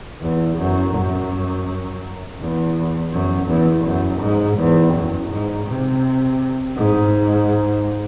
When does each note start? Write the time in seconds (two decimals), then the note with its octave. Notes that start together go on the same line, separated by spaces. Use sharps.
0.22 E2
0.58 F#2
0.94 F#2
2.40 E2
3.12 F#2
3.48 E2
3.85 F#2
4.21 G#2
4.57 E2
4.94 F#2
5.30 G#2
5.67 C3
6.76 G#2